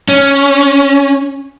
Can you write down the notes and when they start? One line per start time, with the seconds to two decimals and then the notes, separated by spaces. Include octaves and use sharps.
0.08 C#4